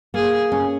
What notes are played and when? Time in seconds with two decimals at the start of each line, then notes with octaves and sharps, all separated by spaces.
0.14 A#3 G#4
0.52 C#4